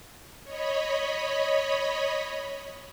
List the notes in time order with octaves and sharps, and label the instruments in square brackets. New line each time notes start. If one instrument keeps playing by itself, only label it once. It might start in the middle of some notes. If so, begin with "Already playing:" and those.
[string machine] C#5 D#5 B5